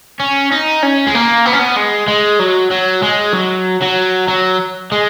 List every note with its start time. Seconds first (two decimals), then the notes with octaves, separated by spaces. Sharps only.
0.20 C#4
0.52 D#4
0.83 C#4
1.07 G#3
1.15 A#3
1.46 B3
1.53 C#4
1.59 B3
1.77 G#3
2.08 G#3
2.39 F#3
2.71 F#3
3.03 G#3
3.34 F#3
3.81 F#3
4.28 F#3
4.92 G#3